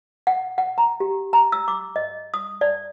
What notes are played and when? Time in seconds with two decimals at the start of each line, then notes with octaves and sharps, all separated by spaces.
0.27 F#5
0.58 F#5
0.78 A#5
1.00 G4
1.33 A#5
1.52 E6
1.68 D6
1.96 D#5
2.34 D#6
2.61 D5